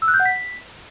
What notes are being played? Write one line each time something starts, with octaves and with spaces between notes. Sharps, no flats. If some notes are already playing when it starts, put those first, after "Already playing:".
E6
F#6
G6
F#5
B6